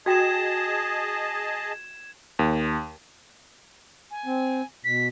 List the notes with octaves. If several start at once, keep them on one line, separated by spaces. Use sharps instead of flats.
F#4 G#4 D#5 G5 A5 G#6 E7
D#2
G#5
C4
B2 B6